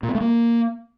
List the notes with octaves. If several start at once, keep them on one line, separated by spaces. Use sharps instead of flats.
A#2
B3
A3
A#3